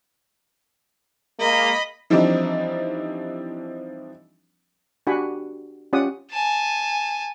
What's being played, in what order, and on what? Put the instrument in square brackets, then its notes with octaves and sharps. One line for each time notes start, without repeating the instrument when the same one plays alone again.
[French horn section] G#3 A#3 [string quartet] D#5 B5
[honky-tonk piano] E3 F3 G3 C4 D4 D#4
[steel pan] D4 F#4 G4 F#5 G#5 B5
C#4 F4 G4 D5 F#5 D#6
[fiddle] G#5 A5